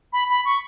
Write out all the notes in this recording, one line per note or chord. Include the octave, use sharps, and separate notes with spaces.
B5
B5
C#6